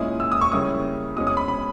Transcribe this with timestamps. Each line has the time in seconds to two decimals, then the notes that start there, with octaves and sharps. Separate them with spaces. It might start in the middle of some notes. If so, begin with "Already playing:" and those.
Already playing: A#2 G#3 C#4 E4 D#6
0.20 E6
0.32 D#6
0.41 C#6
0.52 C#3 G3 A#3 C#4 E4 D#6
1.16 B2 G#3 C#4 D#6
1.27 D#6
1.37 B5
1.48 B5